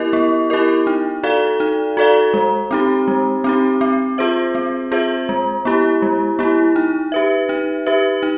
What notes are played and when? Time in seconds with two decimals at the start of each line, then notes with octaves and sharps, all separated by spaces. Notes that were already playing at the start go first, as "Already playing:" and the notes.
Already playing: B3 E4 G4 A#4 D#5
0.13 B3
0.50 E4 G4 A#4 D#5
0.87 D#4
1.23 F#4 A4 D5 F5
1.60 D#4
1.97 F#4 A4 D5 F5
2.34 G#3
2.71 C4 D#4 G4
3.08 G#3
3.44 C4 D#4 G4
3.81 C4
4.18 F4 G#4 C5 E5
4.55 C4
4.92 F4 G#4 C5 E5
5.29 G#3
5.65 B3 E4 G4
6.02 G#3
6.39 B3 E4 G4
6.76 D#4
7.12 G4 B4 E5
7.49 D#4
7.86 G4 B4 E5
8.23 D#4